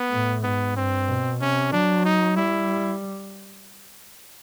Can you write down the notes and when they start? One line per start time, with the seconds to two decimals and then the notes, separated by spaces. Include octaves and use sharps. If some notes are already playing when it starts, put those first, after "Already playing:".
Already playing: B3
0.11 A2
0.43 G#2 B3
0.75 G2 C4
1.08 B2
1.40 C3 C#4
1.72 F#3 D4
2.05 D#4
2.37 G3 E4